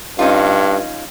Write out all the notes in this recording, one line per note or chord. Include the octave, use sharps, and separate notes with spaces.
G2 C#4 D#4 F4